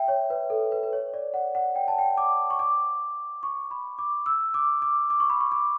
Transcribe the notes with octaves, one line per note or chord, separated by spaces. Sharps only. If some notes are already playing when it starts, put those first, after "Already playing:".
Already playing: E5 G5
C#5
B4
A4
B4
B4
C#5
D5
F#5
F#5
G5
A5
G5
D6
C#6
D6
C#6
B5
D6
E6
D6
D6
D6
C#6
B5
C#6
D6